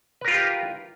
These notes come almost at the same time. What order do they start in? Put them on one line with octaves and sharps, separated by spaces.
B4 A#4 F4 G4